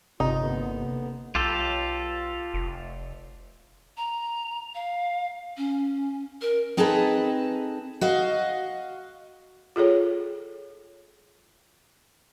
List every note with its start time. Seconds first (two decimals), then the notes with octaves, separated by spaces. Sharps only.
0.20 G1 C3 D#4 F4
0.40 D#2 D3 B3
1.35 B1 F4 G4 A4
2.54 F1
3.97 A#5
4.75 F5
5.57 C#4
6.42 A#4
6.77 C4 D#4 G#4 A4 B4 A5
8.01 F#4 D#5 F5
9.76 F4 G#4 A4 C#5